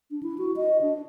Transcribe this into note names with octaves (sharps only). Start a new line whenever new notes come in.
D4
E4
F#4
D#5
D4